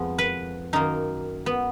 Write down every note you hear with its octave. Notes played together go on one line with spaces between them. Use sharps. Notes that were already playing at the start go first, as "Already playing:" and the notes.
Already playing: F2 F3 G#3 B3
B4
F#2 D#3 A#3 D#4
B3